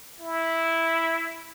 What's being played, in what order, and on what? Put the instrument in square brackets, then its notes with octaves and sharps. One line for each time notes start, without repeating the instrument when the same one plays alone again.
[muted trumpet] E4